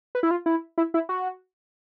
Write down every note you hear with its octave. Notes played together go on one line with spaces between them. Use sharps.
B4
E4
F4
E4
E4
E4
F#4